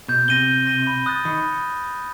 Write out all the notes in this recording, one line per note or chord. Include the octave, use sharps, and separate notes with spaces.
B2 G6
C3 A#6 D#7 G7
G6
A#6 D#7 G7
B5
D#6 F#6 A6
D#3 B5